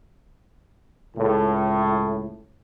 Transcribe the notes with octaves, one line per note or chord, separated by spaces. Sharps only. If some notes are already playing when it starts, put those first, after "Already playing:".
C#2 A2